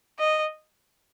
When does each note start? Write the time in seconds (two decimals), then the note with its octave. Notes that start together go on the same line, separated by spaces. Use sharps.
0.19 D#5